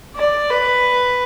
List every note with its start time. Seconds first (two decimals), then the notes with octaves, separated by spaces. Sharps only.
0.16 D5
0.50 B4